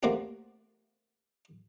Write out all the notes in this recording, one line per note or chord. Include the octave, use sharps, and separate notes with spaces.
A3 A#3 C4 C#4 F#4 G4